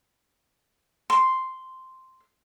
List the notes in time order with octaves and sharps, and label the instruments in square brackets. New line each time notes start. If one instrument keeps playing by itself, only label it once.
[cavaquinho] C6